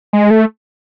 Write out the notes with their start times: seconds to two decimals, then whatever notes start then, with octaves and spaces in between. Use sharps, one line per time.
0.13 G#3
0.31 A3